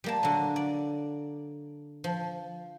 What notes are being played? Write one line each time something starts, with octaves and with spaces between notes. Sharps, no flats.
G3 A#3 A5
D3 F#3
D5
F3